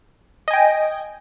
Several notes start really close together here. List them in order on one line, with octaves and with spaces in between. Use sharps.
D#5 G#5 G5